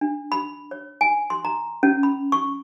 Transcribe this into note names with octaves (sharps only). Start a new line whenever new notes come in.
D4
B5
C#5
G#5
C6
A#5
C#4
B5
C#6